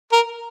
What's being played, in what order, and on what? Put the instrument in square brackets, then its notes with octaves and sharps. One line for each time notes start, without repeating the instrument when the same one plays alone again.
[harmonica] A#4